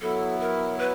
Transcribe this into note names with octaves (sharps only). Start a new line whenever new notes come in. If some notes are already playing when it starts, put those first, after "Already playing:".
F#3 B3 E4 A4
A#4
B4